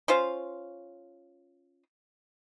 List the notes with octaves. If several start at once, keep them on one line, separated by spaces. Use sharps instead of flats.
C#4 F4 C5 F5